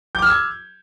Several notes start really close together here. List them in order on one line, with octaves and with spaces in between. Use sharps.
G6 D6 F6 E6 G#6